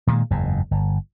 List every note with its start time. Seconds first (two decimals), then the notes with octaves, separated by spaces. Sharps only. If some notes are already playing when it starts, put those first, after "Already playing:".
0.07 A#2 D#3 F3 G#3
0.31 F#1 E2 G#2
0.71 G1